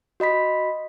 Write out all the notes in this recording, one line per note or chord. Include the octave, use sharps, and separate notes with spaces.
F#4 D#5 B5 B6